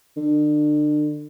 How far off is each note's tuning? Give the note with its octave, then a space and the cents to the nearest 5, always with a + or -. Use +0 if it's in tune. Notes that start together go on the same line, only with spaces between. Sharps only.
D3 +35